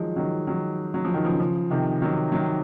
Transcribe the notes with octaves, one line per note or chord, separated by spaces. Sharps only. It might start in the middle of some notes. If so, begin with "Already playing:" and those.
Already playing: D#3 F3 F#3 G#3
D#3 F#3
D#3 F#3
F#3
F3
D#3
C#3 F3
C#3 F3
C3 D#3
D#3 F#3
D#3 F#3